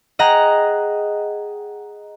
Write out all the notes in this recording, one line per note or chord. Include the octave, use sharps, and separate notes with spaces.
G#4 D#5 F#5 G5 A#5